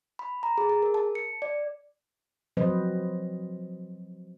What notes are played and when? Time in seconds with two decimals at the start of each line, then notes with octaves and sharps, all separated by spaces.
0.19 B5
0.43 A#5
0.58 G#4
0.69 G#4
0.82 A#4
0.94 A5
1.15 C#7
1.42 D5
2.57 F3 F#3 C4 B4 C5 D#5